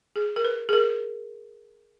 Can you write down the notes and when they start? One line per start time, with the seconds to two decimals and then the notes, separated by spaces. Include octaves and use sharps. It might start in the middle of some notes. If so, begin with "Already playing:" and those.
0.16 G#4
0.36 A#4
0.45 B4
0.69 G#4
0.73 A#4